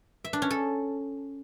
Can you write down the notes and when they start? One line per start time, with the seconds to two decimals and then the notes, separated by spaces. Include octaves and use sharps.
0.24 E5
0.33 D4
0.42 C#4
0.51 A4